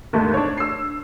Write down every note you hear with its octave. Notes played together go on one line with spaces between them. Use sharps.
D#2 G#2 D3 A3
D4 C#5
E6 C7